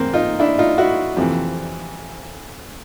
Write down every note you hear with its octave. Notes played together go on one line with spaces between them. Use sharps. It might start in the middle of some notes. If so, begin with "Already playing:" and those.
Already playing: G#2 E3 A#3 C4
D#4 F4
D4 E4
D#4 F4
E4 F#4
F2 C3 E3